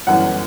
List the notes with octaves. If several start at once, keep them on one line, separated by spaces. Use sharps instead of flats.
G1 F#2 E3 F#5